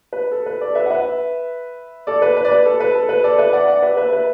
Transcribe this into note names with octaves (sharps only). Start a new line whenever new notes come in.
B4
A4
B4
A4 D5
B4 E5
F#5
B4 E5
A4 D5
B4
B4
D5
B4
A4
B4
A4
B4
A4 D5
B4 E5
D5 F#5
D5 F#5
B4 E5
B4 E5
B4